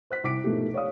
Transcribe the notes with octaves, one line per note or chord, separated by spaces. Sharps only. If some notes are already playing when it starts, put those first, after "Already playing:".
C5 F#6 B6
C2 D6 B6 D7
G#2 B2 F3 A3 A#3 G4
C#5 D5 F5 D#6